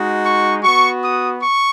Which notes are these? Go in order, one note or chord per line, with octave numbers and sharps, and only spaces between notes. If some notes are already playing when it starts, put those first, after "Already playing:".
Already playing: G#3 D#4 F#4
C#6
B3 F#4 C#6
D#6
C#6